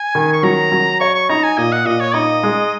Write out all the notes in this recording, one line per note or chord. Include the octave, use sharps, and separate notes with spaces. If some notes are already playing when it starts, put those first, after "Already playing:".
Already playing: G#5
D#3
C#6
F#3 A#5
F#3
C#5 C#6
C#6
D#4 A#5
G#5
A#2 D#5
F#5
A#2 D#5
C#5
D#4 D#5
G#3